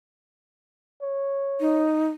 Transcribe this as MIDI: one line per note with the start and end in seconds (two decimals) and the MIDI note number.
1.02 1.85 73
1.60 2.08 63